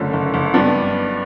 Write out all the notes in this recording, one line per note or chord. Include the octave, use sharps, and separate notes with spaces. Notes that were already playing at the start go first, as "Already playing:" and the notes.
Already playing: F#1 D3 A3 C#4
F#1
F#1
G2 B3 D4